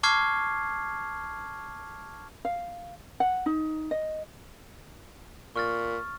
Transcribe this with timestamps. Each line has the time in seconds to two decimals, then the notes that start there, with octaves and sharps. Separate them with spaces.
0.03 A5 C#6 D6 F6 G#6 C7
2.45 F5
3.20 F#5
3.46 D#4
3.91 D#5
5.56 A#2 C#6 F6 A6